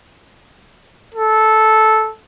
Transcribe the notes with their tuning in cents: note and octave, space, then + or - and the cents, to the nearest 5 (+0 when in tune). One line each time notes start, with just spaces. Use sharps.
A4 -10